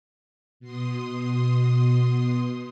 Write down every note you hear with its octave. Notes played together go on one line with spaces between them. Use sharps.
B2 C6 D#6